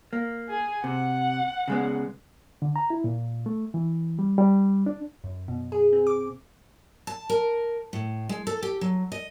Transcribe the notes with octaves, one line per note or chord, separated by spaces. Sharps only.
A#3
G#4
C3 F#5
C#3 G#3 B3
D3
A#5
E4
A#2
A3
E3
G3
G3
D4
F#2
B2
G#4
C4
D6
A5
A#4
A2
G#3
A4
G4
F#3
D#5